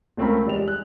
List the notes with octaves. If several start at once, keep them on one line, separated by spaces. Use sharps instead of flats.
C#2 A3 C4 C#4 A#4 B5
E2 G3 G#3 F7
F#6